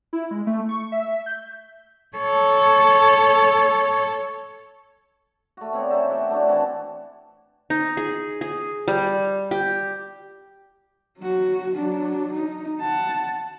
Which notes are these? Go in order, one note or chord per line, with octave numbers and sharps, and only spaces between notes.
E4
G#3
A3
C#6
E5
G6
A4 C#5
A3 F#4
B3 C4 C#5 D5
C#4 D#4 C5 E5
F#4 E5 F#5 G5
A3 D4 E4 F#4
E3 C4 F#4 A5
D#4
G#4
G#4
G3
G4
F#3 F#4
F#3 D4
D#4
F#5 A5